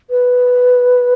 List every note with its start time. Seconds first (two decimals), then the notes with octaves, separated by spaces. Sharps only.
0.10 B4